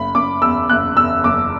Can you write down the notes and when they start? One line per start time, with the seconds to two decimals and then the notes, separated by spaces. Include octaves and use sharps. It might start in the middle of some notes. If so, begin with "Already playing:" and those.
Already playing: F#1 B5
0.15 F#1 D6
0.42 E2 E6
0.69 F#1 F#6
0.97 E2 E6
1.24 F#1 D6